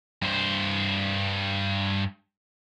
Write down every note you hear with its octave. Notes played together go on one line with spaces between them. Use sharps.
G2 C5